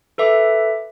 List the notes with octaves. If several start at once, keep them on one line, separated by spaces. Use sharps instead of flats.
A4 B4 E5 D6